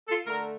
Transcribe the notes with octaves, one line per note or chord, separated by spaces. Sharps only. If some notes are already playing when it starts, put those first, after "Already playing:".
F4 A4
D3 A3 A#4